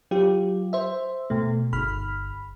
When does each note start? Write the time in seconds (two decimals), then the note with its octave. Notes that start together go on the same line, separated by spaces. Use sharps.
0.11 F#3 F4 G4
0.73 C5 E5
1.30 B2 A3
1.73 G1 B5 F6